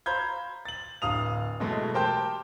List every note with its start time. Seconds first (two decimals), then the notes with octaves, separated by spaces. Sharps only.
0.06 C5 F5 A#5 B5 G6 G#6
0.65 A6 F#7
1.02 D1 F5 D#6 F7
1.60 B2 E3 F#3 G#3 A3
1.94 G4 A#4 C5 G5 A5 G6